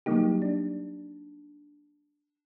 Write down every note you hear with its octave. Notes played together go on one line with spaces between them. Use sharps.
F#3 G3 A#3 D#4 G4
D4